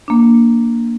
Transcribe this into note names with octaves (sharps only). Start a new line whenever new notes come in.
A#3 D4